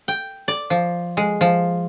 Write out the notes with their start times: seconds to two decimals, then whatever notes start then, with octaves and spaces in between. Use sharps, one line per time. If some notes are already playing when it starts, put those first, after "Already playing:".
0.08 G5
0.48 D5
0.70 F3
1.17 G#3
1.41 F3